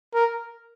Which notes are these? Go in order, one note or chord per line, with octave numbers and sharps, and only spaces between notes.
A#4